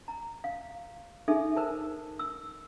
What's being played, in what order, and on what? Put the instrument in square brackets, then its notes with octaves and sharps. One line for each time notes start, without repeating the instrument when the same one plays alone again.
[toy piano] A#5
F5
D#4 G#4 A4 E5
A#4 C5 A5
E6